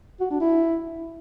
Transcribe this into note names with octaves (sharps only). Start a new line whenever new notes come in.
F#4
D4
E4